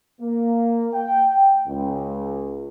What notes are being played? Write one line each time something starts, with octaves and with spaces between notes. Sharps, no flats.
A#3
G5
C#2